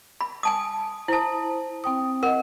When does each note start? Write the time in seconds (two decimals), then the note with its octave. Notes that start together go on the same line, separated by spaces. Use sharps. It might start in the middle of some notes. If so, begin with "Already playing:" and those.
0.21 B5
0.43 G#5 A5 D#6
1.08 E4 C5 A5 D#6
1.84 C4 G5 D#6
2.23 A#4 D#5 F#5